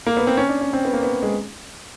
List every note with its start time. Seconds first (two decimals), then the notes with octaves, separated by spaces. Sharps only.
0.07 A#3
0.17 B3
0.27 C4
0.37 C#4
0.49 D4
0.61 C#4
0.73 C4
0.85 B3
0.93 A#3
1.03 B3
1.23 G#3